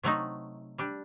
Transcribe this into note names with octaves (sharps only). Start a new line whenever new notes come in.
C3 F#3 A3 D#4
G3 D4 G4